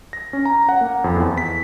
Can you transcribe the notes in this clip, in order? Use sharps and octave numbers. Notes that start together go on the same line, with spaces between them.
A#6
C#4
A#5
F#5
A#3
F2
E2
B6